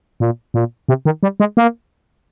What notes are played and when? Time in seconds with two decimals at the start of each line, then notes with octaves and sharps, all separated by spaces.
0.20 A#2
0.54 A#2
0.89 C3
1.05 D#3
1.23 G3
1.40 G#3
1.57 A#3